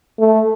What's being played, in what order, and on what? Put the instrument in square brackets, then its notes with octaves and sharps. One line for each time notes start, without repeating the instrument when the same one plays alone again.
[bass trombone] A3